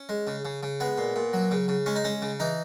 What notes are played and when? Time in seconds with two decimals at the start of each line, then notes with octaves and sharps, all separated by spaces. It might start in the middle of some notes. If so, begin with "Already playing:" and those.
Already playing: C#4
0.09 G#3
0.27 C#3
0.45 C#3
0.63 C#3
0.80 G#3 B3
0.98 A#2
1.16 A#2
1.33 F#3
1.51 C#3
1.68 C#3
1.86 G#3 C#4
1.96 D#4
2.04 G#3 C#4
2.22 C#3
2.40 E3 D#4